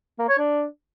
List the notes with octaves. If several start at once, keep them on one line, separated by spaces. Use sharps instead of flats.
A#3
C#5
D4